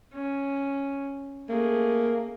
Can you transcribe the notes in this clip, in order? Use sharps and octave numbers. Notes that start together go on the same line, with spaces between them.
C#4
A3 A#3 G#4